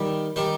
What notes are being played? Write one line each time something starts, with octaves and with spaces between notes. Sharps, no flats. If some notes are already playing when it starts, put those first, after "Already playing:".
Already playing: D#3 G3
D#3 G3 D#4